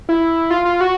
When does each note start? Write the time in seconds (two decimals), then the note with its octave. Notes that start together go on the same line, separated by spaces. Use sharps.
0.09 E4
0.51 F4
0.65 F4
0.81 F#4